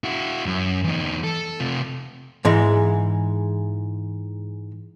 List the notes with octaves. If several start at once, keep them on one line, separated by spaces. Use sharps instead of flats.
E4 F#4
F#2
E2 D#4
A4
C3 F4
G#2 E3 G#3